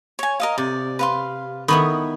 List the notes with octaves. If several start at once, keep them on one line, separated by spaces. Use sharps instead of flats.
C#5 G#5
A#4 D#5 F5
C3 D5
B4 F5 C6
D#3 B3 E4 B5 C#6 D#6